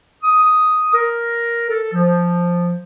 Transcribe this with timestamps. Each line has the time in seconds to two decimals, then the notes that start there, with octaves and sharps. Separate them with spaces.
0.23 D#6
0.94 A#4
1.69 A4
1.93 F3